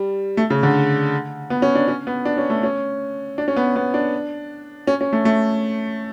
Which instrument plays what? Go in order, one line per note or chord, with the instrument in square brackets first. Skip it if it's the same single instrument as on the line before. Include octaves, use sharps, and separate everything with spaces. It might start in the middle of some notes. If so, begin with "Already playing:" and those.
Already playing: [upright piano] G3
A3
C#3
D3
B3
C#4
D4
C#4
B3
D4
C#4
A3
C#4
D4
C#4
B3
B3
D4
C#4
C#4
A3
A3